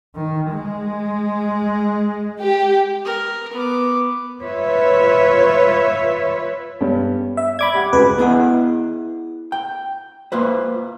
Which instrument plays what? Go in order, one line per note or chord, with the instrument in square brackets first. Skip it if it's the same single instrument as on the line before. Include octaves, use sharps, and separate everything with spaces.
[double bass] D#3
G#3
[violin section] G4
[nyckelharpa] A#4
B3 D6
[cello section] F4 B4 C#5 E5
[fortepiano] G2 B3 C#4
[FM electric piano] E5
[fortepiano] D5 [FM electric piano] B5 D6 G#6
[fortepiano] G4 F#5
[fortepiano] C#2 F#4 G#4 [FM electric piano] B4
[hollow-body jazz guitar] B3 E4 G#4 D#5 F#5
G5
A#3 F4 B4 C5